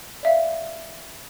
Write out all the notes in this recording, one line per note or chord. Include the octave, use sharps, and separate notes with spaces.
D5 E5 F5